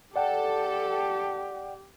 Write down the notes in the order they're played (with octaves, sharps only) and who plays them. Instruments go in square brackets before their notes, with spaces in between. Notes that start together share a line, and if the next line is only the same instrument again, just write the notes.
[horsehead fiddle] G4 [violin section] A4 [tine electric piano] D5 F#5 G5